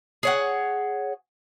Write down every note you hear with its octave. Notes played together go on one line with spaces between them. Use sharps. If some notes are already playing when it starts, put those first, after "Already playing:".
G#4 C#5 F#5